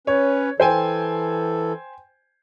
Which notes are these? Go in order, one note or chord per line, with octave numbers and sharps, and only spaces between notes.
C#4 B4 C#5
E3 A4 C5 G5 G#5